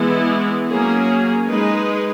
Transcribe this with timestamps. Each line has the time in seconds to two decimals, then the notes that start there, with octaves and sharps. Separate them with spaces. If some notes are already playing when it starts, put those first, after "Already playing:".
Already playing: E3 G#3 B3 E4
0.70 F#3 A#3 C#4 G#4
1.49 G#3 D#4 G#4 B4